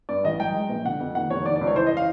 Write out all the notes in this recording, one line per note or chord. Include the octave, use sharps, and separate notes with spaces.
G2 D5
A1 D#5
F#3 G5
G#3
A#1
D3 F#5
F2
D#2 F#5
F1 C#5
D#3 D5
D5
C#2
C#5
E3 C5
D#5
E3
F5